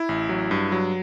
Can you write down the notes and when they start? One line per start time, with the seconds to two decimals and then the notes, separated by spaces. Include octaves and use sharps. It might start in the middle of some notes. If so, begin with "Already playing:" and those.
Already playing: E4
0.09 A1
0.29 F#3
0.51 G2
0.72 F#3